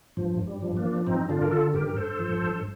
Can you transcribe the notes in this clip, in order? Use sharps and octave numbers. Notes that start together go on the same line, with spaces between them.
G2 F3
G2
G3
F3
A#3 D4
F3
G2 C4 D#4
D3 D4 F4
A#4
D3 F4 A4
G2 G4 A#4
A#4
G2 A4 C5
F3
G2